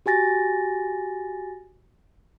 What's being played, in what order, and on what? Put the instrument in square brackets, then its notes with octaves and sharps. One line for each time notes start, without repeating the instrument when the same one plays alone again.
[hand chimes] F#4 G4 G#5 A6 A#6